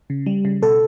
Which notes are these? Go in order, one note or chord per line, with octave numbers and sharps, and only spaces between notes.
C#3
G3
C#3
B2 A4